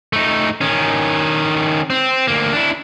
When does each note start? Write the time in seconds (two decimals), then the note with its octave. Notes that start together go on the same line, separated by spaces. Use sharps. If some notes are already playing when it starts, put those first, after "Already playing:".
0.13 A3 D#4
0.61 D#3 C#4
1.90 C4
2.27 D2 A#3
2.53 D4 E4